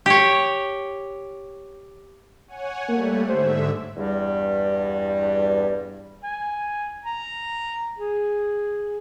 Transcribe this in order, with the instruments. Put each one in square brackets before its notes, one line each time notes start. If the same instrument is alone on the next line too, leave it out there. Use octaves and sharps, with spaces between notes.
[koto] G4 C#5
[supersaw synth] C#5 F#5 G#5
[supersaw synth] G3 A3 [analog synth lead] A#3
[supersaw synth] G#2 D3 E5 [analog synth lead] C5
[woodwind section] E2 G2 G3
[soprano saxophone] G#5
A#5
G#4